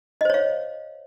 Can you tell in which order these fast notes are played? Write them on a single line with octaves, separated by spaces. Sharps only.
D#5 C5 C#5 F5